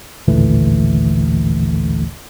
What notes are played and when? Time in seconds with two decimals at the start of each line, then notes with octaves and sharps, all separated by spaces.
0.28 A1 D#2 A#2 D3 E3 A3